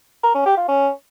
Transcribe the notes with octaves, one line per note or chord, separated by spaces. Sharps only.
A#4
C#4
G4
F4
C#4